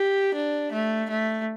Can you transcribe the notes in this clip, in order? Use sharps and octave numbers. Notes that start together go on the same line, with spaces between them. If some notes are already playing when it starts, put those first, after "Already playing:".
Already playing: G4
D4
A3
A3